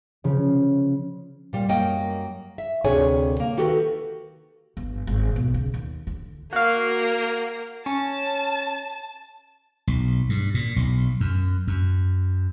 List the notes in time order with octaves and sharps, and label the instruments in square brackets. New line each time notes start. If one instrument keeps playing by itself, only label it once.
[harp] C#3 F3
[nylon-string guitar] A#2 G3
F#2 A#3 D#5 G5
E5
D2 C3 D4 G#4 C#5 G#5
A#3
D#3 F#4 G4 A4 B4
[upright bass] G1
G#1
B1
C#3
D#2
D3
[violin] A#3 [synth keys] F#4 F5
[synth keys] C#4 [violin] A5
[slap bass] B1
G2
A#2
B1
F#2
F#2